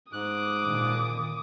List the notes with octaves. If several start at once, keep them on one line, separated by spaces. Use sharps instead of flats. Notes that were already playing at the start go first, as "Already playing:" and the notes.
G#2 D6 D#6 F#6
A#2 D3 D#3